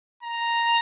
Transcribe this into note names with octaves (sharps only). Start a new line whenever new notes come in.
A#5